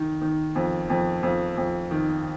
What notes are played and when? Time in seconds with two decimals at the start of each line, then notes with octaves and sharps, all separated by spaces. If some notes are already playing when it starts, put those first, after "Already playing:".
Already playing: D#3
0.22 D#3
0.56 F2
0.90 F2
1.23 F2
1.57 F2
1.91 D#3